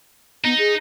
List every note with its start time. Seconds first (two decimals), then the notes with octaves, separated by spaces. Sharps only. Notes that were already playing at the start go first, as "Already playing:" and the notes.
0.45 B3 D#4
0.58 G#4